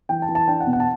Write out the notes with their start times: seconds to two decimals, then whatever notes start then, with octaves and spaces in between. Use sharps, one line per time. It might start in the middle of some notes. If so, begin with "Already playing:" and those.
0.09 E3 G5
0.22 A5
0.29 E3
0.35 A5
0.48 D4 G5
0.60 F#5
0.67 B2
0.73 F#5
0.80 A5